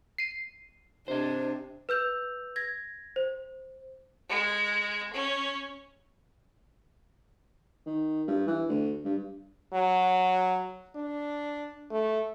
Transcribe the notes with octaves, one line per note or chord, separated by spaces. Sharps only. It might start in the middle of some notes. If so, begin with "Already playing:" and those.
C7 D#7
C3 D4 C5 D#5
B4 E6 G6 F7
G#6 A#6
C5
G#3
C#4
D#3
G2
E3
D2
G2
F#3
D4
A3